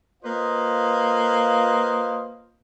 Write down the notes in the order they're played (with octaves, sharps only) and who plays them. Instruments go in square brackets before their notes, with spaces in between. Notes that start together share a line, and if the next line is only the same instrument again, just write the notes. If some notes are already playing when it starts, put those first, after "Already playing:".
[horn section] A#3 F4 B4 C5 D#5 F5